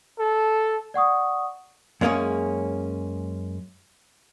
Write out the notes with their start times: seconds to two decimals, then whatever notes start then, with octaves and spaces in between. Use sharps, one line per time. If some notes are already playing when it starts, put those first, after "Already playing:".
0.19 A4
0.94 D5 F#5 C#6 D#6
2.01 F#2 G#3 A#3 B3 C#4 G#4